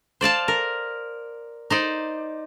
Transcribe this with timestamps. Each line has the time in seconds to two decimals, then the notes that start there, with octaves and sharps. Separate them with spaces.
0.21 C5 D5 F5 A5
0.48 A#4
1.70 D#4 C5 D5